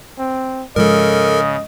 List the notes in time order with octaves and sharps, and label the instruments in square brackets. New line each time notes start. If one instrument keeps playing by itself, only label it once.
[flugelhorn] C4
[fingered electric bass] G#2 F3 G#3 [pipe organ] C#3 [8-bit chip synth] A4 A#4 [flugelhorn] D#5